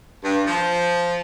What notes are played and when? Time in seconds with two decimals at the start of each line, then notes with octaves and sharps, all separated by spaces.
0.24 G2
0.45 F3